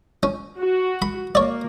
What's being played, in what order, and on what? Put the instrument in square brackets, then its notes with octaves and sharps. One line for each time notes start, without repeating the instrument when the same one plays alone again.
[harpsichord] C#4
[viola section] F#4
[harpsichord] B5
[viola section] A#3 [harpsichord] C#5 D5